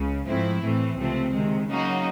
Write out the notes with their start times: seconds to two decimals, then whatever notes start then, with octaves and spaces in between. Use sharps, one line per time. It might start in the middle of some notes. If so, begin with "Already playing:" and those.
Already playing: C#2 C#3
0.27 G#2 F3 A3 C4 E4
0.62 A2 E3 A3 C4
0.97 C#2 C3 F3 A3 C4
1.33 C3 D#3 G#3
1.68 C#3 F#3 A#3 D#4 F#4